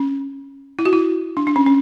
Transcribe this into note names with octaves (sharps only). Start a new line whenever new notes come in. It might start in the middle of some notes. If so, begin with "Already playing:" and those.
Already playing: C#4
E4
F#4
E4
D4
D4
C#4
C#4